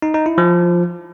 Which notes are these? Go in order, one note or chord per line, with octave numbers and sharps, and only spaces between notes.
D#4
D#4
E4
F3